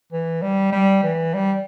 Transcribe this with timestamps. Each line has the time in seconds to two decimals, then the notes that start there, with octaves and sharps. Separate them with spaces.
0.13 E3
0.42 G3
0.72 G3
1.03 E3
1.34 G3